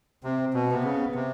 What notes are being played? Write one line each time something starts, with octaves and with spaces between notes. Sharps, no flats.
C3 C4
B2
C3 B3
C#3
C3